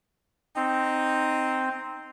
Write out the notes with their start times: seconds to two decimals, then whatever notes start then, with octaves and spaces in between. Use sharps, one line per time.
0.56 C4 D#4